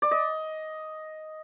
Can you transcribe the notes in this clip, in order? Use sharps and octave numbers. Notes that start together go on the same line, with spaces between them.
D5
D#5